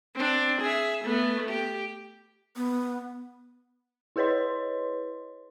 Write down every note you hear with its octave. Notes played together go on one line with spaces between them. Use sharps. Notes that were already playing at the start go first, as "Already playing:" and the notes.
C4 D4
G#4 E5
A3 B3
G4
B3
E4 G#4 B4 C#5 D#5 C6